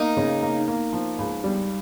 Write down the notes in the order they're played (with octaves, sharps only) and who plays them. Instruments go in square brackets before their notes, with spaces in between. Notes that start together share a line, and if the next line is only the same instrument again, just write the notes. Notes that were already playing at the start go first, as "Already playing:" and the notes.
Already playing: [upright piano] A#3 [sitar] D#4
[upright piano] C#3
A#3
A#3
F3
C#2
G3